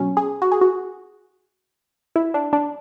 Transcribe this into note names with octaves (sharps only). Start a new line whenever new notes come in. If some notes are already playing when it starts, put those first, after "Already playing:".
Already playing: B2 F#3 C#4
G#4
F#4
G#4
F#4
E4
D4
D4